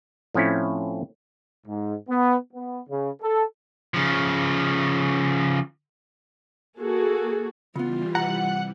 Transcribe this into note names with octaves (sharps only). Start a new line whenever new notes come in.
A2 F3 C4 C#4 E4
G#2
B3
B3
C#3
A4
C#3 F3
A#3 F#4 G#4 A4
C#3 E3 G3 B3 F4
C2 F#5 A#5